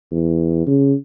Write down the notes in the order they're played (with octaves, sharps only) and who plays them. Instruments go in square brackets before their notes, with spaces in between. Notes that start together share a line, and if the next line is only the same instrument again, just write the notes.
[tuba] E2
C#3